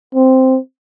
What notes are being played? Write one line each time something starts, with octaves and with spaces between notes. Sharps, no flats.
C4